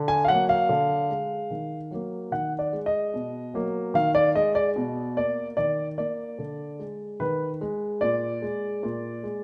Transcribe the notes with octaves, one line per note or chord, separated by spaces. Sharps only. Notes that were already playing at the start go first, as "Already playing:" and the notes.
Already playing: D3
G#5
F5
F#3 A#3 F#5
F5
D3
G#3
D#3
F#3 A#3
D#3 F#5
D5
G#3
D#5
B2
F#3 A#3
D#3 F5
D5
G#3 D#5
D5
B2
A#3 D5
D#3 D5
A#3 D5
D3
G#3
D#3 B4
G#3
A#2 D5
G#3
A#2
G#3